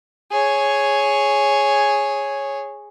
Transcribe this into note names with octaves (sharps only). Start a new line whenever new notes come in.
G#4 C#5